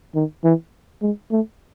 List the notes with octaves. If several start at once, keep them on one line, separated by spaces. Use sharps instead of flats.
D#3
E3
G#3
A3